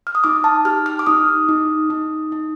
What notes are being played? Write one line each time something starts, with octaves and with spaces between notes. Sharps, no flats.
F6
D#6
D#4 D6
A5
G4 F6
F6
D6
D#4 D#6
D#4
D#4
D#4